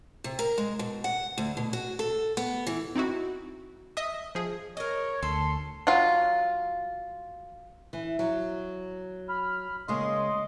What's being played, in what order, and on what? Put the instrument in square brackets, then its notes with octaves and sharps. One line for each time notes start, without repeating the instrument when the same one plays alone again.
[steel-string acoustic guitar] C3
A#4
G#3
B2
F#5
D2
B2
F#4
A4
B3
E3
[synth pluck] C4 D#4 E4 F#4
D#5 E5 D#6
F3 G#4
[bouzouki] A#4 D#5 [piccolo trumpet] C#5
[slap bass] D2 [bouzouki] A4 [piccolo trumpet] C6
[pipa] F#3 F4
[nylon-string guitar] E3
F#3
[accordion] B5 F6
[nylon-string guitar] C#3 G#3 A#3 [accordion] D#5 C6